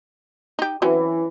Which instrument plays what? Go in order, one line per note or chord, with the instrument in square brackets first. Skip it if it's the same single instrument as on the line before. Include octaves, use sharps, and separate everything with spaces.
[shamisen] D#4 G4
[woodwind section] E3 [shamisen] F#3 C4 C#4